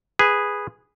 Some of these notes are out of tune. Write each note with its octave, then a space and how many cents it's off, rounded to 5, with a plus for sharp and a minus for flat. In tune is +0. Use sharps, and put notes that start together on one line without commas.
G#4 -10 B4 +0